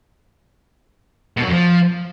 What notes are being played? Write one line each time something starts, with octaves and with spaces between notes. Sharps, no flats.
B2
F#3
F2
F3